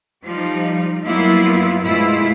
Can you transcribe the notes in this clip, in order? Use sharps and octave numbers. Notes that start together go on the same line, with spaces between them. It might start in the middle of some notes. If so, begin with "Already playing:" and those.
F3 G3 D#4
G2 F#3 A#3 B3 E4 F4
G#2 B2 A3 E4 F4